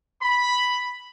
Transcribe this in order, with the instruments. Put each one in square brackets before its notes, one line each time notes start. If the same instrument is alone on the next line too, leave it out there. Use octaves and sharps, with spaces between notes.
[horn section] B5